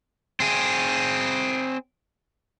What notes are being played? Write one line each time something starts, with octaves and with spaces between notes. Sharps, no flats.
C4 G#4